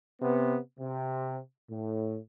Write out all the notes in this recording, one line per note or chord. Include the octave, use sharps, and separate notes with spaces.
C3 B3
C3
A2